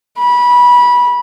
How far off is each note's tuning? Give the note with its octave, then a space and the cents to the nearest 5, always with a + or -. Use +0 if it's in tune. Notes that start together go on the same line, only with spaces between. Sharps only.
B5 -20